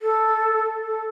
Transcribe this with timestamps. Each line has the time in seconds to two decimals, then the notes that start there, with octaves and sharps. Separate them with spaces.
0.02 A4
0.84 A4